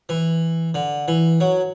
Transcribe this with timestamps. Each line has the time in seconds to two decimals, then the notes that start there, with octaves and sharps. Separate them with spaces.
0.09 E3
0.74 D3
1.08 E3
1.40 F#3